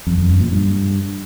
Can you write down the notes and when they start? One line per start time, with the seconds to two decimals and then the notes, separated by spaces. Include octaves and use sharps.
0.07 F2
0.18 F2
0.29 F#2
0.41 A#2
0.52 G2